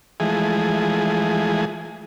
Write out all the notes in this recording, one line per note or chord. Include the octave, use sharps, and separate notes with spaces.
E3 F3 G#3 A3 G#4